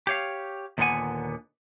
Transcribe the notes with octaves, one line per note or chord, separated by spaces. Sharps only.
G4 C#5 F5
D#2 A#2 D3 B3 F#5 G#5